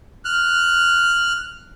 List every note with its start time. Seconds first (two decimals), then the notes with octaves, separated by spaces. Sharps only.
0.25 F6 F#6